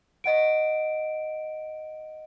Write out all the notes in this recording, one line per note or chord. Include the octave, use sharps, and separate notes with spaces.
D#5 F#5 D7